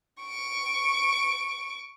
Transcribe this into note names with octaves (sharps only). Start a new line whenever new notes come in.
C#6 D7